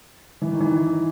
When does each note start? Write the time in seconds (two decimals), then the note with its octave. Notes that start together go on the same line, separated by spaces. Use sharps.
0.42 E3
0.51 D#3
0.60 E3